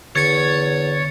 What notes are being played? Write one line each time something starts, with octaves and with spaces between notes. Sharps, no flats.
E2 D3 C#5 G#6 A6 C#7